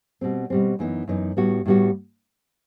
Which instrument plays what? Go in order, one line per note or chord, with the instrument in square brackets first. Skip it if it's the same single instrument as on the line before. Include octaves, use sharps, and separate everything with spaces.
[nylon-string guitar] B2 G3 C4
B2 G3 C4
F#2 E3 B3 D#4
F#2 E3 B3 D#4
A2 G3 B3 F#4
A2 G3 B3 F#4